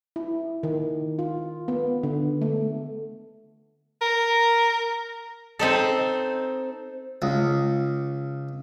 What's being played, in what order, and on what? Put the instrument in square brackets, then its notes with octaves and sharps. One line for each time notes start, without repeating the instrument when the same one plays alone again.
[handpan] E4
D#3
F4
B3
D3
A3
[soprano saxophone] A#4
[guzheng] C4 D#4 A4
[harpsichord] C#2